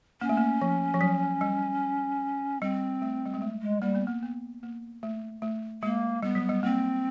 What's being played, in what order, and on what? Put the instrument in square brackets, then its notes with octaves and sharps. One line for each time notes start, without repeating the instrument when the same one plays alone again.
[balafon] A#3 [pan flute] C#4
[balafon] A3
A#3
F3
F3
F#3
G3
[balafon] G3 [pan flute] C4
[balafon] A3
G3
G#3
A3
[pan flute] G#3
[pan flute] G3 [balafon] A#3
[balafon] B3
A#3
B3
A#3
A3
A3
[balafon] G#3 [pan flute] A#3
[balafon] G3 [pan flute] B3
[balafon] F#3
G3
[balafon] A#3 [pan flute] C4